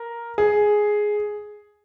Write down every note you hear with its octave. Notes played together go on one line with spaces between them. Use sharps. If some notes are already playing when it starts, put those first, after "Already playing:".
Already playing: A#4
G#4